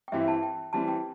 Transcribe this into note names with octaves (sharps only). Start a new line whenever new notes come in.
G5
G2 E3 C4 E4 G4 E5
A5
G5
E3 G3 C4 A5
G5